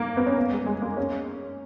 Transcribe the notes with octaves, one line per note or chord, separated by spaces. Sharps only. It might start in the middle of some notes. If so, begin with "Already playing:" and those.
Already playing: A#3
B3
C#4
B3
G#3
G#3
A#3
C#4